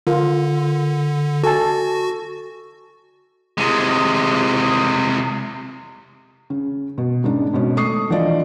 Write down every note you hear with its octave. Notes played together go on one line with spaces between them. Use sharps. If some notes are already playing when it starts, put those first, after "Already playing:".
D3 F4 A#4
F#4 A4 G#5 A5
C3 G#3
C#3
B2
G#2 C#3 D4
G#1 B2 C#4
A3 C#6 D#6 C7
E3 F3 D4 D5 D#5